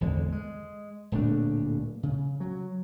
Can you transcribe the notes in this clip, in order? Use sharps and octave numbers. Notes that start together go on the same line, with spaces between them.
G#1 E2 D3 G#3
G#3
D1 A#2 A3 D4
C#3
F#3